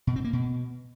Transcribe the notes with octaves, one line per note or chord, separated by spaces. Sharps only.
B2
C4
A#3
B2